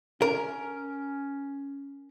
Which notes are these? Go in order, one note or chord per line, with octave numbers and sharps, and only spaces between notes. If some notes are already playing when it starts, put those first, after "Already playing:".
C#4 A#4